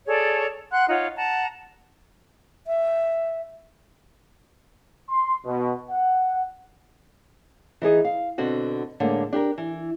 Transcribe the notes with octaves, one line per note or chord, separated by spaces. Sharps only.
G#4 A4 C#5 D5
F#5 C6 F#6
D#4 F4 C#5 F#5
F#5 A5 A#5
E5
C6
B2
F#5
E3 D#4 G#4 D#5
F5
B2 D3 C4 F#4
A2 D3 G#3 A#3
D4 G4 A4 A#4
E3